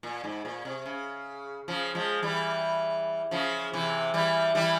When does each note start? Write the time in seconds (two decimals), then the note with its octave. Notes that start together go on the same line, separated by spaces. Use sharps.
0.03 A#2
0.24 G#2
0.45 A#2
0.65 C3
0.86 C#3
1.68 C#3 F3
1.95 F3 G#3
2.23 E3 G3
3.31 C#3 F3
3.73 C3 E3
4.14 E3 G3
4.55 E3 G3